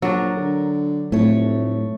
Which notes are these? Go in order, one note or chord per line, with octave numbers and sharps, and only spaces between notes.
A#1 F#3 D4 A#4
D3
F1 A2 A3 C#5